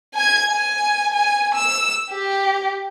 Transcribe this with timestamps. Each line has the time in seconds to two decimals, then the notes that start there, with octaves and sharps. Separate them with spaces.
0.14 G#5 G#6
0.51 G#5
1.13 G#5
1.55 E6
2.11 G4